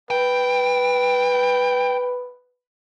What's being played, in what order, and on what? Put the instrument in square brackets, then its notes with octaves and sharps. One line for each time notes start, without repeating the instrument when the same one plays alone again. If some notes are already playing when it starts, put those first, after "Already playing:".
[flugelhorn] B4 [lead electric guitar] G5